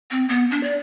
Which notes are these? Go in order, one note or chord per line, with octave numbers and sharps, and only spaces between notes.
C4
B3
D4
D5